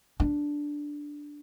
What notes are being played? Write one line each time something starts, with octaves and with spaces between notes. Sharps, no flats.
D4